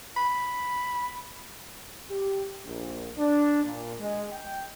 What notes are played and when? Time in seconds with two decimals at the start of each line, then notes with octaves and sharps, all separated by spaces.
0.17 B5
2.10 G4
2.64 A#1
3.18 D4
3.64 A#2
3.99 G#3
4.33 G5